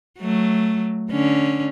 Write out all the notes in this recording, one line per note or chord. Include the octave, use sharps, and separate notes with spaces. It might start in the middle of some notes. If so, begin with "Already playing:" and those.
F#3 A3
D3 C#4